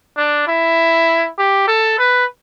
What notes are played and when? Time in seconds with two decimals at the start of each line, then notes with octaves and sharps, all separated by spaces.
0.17 D4
0.47 E4
1.38 G4
1.68 A4
1.98 B4